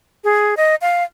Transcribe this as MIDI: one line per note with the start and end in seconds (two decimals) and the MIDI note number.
0.24 0.55 68
0.57 0.75 75
0.81 1.03 77